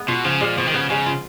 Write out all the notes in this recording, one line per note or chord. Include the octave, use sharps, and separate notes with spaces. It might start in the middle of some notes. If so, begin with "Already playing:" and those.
Already playing: G#3 B3
B2 F4
C#3 F3
A#2 G#3
B2 F3
D#3
C#3 B3
C#3 G#3
F4